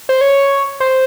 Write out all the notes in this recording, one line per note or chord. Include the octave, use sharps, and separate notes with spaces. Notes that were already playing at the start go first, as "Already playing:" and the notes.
C5
C#5
C5